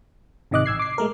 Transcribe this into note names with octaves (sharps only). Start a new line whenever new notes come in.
G#1 C3 D#3 D#5 D6 F#6
A1 E6 G#6 C7
D6 C7
G#3 A3 A#4